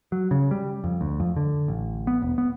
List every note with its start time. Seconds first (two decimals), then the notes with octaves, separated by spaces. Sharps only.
0.12 F#3
0.31 C#3
0.51 G3
0.84 F2
1.01 D2
1.20 F2
1.36 D3
1.68 A1
2.07 B3
2.22 E1
2.38 B3